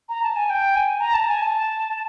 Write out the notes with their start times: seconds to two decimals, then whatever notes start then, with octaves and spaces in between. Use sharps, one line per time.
0.09 A#5
0.23 A5
0.36 G#5
0.50 G5
0.76 G#5
1.00 A#5
1.14 A5
1.28 G#5
1.42 A5